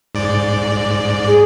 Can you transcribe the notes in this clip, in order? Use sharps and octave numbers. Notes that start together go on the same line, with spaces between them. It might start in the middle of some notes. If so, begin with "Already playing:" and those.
G#2 D5
G#4